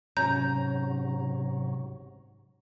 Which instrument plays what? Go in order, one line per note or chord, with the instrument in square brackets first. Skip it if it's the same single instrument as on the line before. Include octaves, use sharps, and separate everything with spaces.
[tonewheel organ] G#2 C3 F#3 [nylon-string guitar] C#4 [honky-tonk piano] A#5 [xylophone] G6